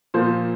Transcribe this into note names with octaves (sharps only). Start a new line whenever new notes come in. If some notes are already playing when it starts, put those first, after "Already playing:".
A#2 F3 A#3 C5